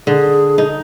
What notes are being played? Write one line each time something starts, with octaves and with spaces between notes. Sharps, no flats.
D3 G#4
D#4